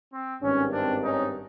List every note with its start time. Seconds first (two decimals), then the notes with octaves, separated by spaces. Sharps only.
0.13 C4
0.43 G#1 G2 D#3 C#4
0.72 C4 D4
1.03 C#4 D#4